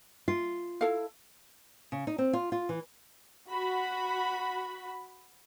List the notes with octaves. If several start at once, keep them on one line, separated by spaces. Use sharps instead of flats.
F4
E4 A4 F5
C#3
D#4
C4
F4
F4
E3
F#4 B5